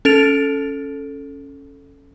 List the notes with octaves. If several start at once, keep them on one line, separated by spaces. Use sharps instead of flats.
C#4 A4 A6 D7 F7